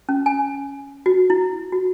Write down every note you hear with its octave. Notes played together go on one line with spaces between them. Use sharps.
C#4
G#5
F#4
E4
F#4